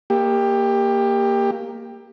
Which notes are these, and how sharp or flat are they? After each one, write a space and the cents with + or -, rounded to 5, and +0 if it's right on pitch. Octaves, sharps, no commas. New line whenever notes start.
A#3 +0 G4 +20